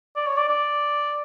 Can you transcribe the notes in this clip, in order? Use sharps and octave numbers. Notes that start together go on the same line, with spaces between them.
D5
C#5
D5
D5